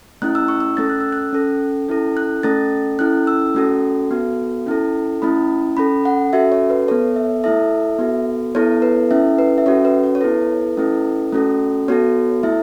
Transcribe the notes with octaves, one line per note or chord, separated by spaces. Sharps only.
A3 C#4 E4 F#6
E6
C#6
E6
A3 C#4 A4 A6
F#6
E6
F#6
C#4 A4
C#4 E4 A4
F#6
A3 C#4 A4 A6
C#4 E4 A4 F#6
E6
A3 C#4 F#4 A4
B3 F#4 A4
C#4 E4 A4
A3 C#4 E4 B5
C#4 A4 B5
F#5
C#4 F#4 A4 E5
C#5
B4
B3 A4 C#5
E5
A3 E4 A4 E5
B3 F#4 A4
B3 E4 A4 C#5
B4
C#4 E4 A4 E5
B4
E5
C#4 F#4 A4 C#5
B4
C#5
C#5
B3 E4 A4 B4
A3 C#4 E4 A4
A3 C#4 F#4 A4
B3 F#4 A4 C#5
A3 E4 A4 E5